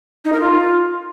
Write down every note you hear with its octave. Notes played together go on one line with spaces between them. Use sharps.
D#4
A#4
F4